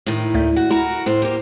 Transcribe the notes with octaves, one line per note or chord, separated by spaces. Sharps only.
A2 D#3
D2 A3 G6
F#4
E4 F#4 A#4
A2 C5
A#3 G4